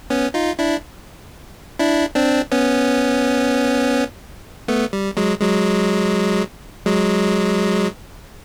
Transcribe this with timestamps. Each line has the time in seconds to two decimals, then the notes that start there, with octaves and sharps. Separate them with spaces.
0.10 B3 C#4
0.34 D#4 F4
0.59 D4 E4
1.79 D4 E4
2.16 C4 D4
2.52 B3 C#4
4.68 A3 B3
4.93 G3
5.17 F#3 G#3
5.41 F#3 G#3
6.86 F#3 G#3